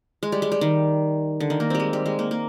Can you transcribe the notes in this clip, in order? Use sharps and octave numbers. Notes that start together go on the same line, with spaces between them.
G#3
G3
G#3
G3
D#3
D3
D#3
A#3
G3 C4
G#3
G3
G#3
A#3
A#3